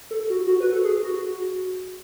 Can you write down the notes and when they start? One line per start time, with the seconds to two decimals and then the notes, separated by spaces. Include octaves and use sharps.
0.11 A4
0.30 F#4
0.47 F#4
0.60 B4
0.72 A4
0.84 G#4
1.03 F#4